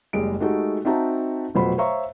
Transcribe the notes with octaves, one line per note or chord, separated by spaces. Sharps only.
F#1 G3 G#3 D7
G#3 A3 D#4 F#4 G4 A4
C4 D#4 F#4 E5 A5 A#5
F1 B2 F#3 F4 C5 B5
C5 C#5 E5 F5 A#5 C#6